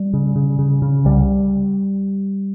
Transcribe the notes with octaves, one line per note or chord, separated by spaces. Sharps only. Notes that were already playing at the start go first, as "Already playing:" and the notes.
Already playing: G3
C#3
C#3
C#3
C#3
C2 G3